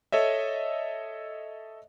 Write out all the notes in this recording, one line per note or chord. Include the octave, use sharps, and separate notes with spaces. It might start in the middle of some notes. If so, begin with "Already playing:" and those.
A4 C#5 D#5 E5